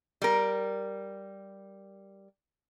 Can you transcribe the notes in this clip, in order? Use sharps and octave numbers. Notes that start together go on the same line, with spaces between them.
G3 A#4